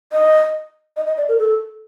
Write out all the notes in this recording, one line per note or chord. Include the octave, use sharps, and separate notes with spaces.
D#5
D#5
D#5
D5
A#4
A4